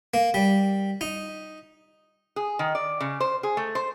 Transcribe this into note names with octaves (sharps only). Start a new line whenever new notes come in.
A#3
G3
D#4
G#4
D#3
D5
C#3
C5
G#4
A3
C5